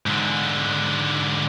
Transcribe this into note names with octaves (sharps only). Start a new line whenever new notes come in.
G#2 D3